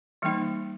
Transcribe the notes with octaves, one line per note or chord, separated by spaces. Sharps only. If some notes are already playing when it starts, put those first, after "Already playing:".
E3 G3 A#3 D#4